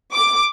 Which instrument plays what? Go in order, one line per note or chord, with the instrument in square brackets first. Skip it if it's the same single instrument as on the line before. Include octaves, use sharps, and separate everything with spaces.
[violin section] D6